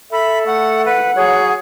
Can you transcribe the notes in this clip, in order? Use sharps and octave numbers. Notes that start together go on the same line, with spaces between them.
A4 E5 B5
A3 F#5
B4 F#5
F#3 G#4 C#5